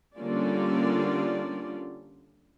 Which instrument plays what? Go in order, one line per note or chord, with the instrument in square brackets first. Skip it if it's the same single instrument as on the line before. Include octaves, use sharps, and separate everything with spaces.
[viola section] D3 G3 A#3 C#4 F4 D5